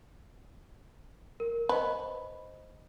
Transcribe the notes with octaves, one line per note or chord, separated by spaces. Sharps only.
A#4
B4 C5 D#5